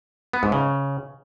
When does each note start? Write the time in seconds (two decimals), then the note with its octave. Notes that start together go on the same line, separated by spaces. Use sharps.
0.33 B3
0.43 G#2
0.52 C#3